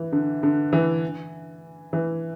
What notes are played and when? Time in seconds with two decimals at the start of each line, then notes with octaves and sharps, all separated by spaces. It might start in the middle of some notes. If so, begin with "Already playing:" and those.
Already playing: E3
0.12 D3
0.43 D3
0.73 E3
1.93 E3